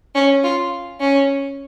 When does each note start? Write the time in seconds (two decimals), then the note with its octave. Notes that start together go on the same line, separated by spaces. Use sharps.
0.15 C#4
0.44 F4
1.00 C#4